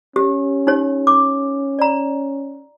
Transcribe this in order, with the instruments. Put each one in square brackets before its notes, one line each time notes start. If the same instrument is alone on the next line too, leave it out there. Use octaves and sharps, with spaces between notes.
[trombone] C#4 [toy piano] G4
[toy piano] D#4 G4 C#5
D6
D5 A#5